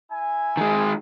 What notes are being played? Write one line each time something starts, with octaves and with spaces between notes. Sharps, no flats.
E4 G#5
D#3 G#3